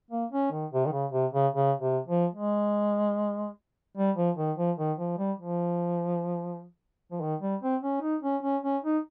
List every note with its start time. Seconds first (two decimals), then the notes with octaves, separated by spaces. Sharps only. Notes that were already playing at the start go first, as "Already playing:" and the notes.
0.11 A#3
0.32 C#4
0.51 D#3
0.72 C3
0.86 D#3
0.92 C#3
1.12 C3
1.34 C#3
1.54 C#3
1.80 C3
2.07 F3
2.35 G#3
3.97 G3
4.16 F3
4.38 D#3
4.58 F3
4.78 D#3
4.99 F3
5.18 G3
5.38 F3
7.11 F3
7.21 D#3
7.41 G3
7.62 C4
7.83 C#4
8.02 D#4
8.23 C#4
8.43 C#4
8.63 C#4
8.84 D#4